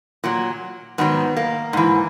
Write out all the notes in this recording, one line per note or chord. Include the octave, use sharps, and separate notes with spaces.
A#2 F#3
G#2 D#3 F#3 B3
A#3
G#2 E3